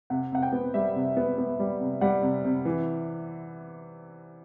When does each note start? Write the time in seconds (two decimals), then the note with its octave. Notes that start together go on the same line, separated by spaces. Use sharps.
0.10 C3 F#5
0.32 C3 F#5
0.43 G5
0.52 B3
0.74 G3 E5
0.95 C3
1.17 B3
1.38 B3
1.59 G3
1.81 C3
2.01 G3 F#5
2.22 C3
2.44 C3
2.65 E3